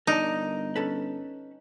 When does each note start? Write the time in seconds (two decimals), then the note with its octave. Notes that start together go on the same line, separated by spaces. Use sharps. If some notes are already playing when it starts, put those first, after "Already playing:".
0.07 G1 D#4 A#4 D5 A5
0.76 C#4 A4 B4